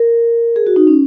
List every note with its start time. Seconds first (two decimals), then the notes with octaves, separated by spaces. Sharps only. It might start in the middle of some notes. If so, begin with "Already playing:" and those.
Already playing: A#4
0.56 G#4
0.67 F#4
0.76 D#4
0.87 C#4